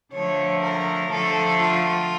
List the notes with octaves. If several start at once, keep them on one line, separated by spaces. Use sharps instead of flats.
D3 F3 A3 C#5
A#4
D3 F3 A3 A4
F4